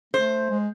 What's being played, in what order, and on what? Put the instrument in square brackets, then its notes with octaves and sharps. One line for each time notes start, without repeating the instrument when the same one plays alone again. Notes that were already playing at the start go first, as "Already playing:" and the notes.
[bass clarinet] A3 [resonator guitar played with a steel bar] C5
[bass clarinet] G#3